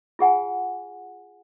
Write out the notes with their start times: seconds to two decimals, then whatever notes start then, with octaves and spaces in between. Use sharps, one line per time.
0.19 F4 G#4 F#5 G#5